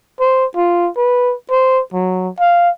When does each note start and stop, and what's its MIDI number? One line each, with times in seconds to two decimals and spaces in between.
0.20 0.46 72
0.57 0.90 65
0.97 1.34 71
1.51 1.81 72
1.93 2.29 54
2.40 2.70 77